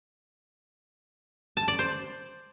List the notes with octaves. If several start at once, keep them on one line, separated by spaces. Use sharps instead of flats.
A5
D5
C5